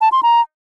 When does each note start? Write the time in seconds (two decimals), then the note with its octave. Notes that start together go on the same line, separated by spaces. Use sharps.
0.01 A5
0.12 C6
0.23 A#5